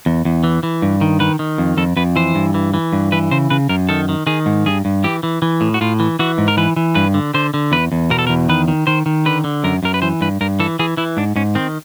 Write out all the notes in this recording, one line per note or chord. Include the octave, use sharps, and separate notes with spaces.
E2
E2
E3
E3
G2
D#3
D#3 B4
D#3
F2
F2 A4
F2 B4
E3 C5
G2
E3
E3
G2
E3 B4
C#3 C5
C#3 B4
F#2 A#4
D#3 A4
D#3
D#3 G#4
G#2
G2 G#4
G2
E3 G4
E3
E3
A2
F#4
A2 F4
E3
E3 F#4
G#2
A#4
E3 B4
E3
G2 B4
D3
D3 C5
D3
E2 B4
E2
B2 A#4
A4
E2 A#4
D#3 B4
D#3
D#3 C5
D#3
D3 B4
D3
F#2 A#4
F#2 A#4
B4
E3 C5
G2 B4
G2 A#4
E3 A4
E3 G#4
E3 E4
G#2 D4
G#2 C#4
D#3 C4